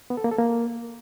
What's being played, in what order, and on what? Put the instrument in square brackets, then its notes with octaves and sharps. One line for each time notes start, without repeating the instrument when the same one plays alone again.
[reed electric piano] B3
A4
A#3
A4
A#3